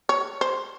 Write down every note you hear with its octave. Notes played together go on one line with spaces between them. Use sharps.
C#5
C5